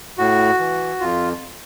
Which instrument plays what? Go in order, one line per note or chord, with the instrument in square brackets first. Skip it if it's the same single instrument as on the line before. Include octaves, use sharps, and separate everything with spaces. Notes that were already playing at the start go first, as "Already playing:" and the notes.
[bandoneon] A2 F#4
E3
F2 F4